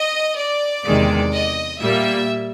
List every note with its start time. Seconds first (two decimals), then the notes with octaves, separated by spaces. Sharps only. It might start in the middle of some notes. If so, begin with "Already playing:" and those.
Already playing: D#5
0.38 D5
0.86 E2 C3 D#3 G#3
1.33 D#5
1.80 A#2 G3 A#3 E5